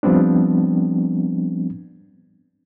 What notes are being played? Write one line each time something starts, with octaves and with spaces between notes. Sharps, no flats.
F3 G3 B3 C4 D4